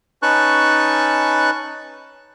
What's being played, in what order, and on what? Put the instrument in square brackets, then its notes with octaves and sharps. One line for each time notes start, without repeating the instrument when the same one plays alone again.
[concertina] C#4 D#4 B4 A5 C#6 F#6